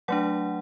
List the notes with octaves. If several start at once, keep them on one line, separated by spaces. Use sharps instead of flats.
F#3 A3 D4 F#5